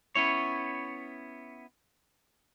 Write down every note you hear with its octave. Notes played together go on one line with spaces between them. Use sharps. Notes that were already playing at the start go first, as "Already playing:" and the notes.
B3 C#4 E4 C#5